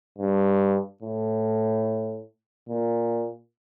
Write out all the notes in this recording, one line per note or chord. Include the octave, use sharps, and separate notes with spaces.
G2
A2
A#2